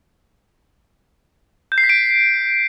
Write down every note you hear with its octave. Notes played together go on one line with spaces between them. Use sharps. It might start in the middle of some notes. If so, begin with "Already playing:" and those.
G6
C7
B6
D7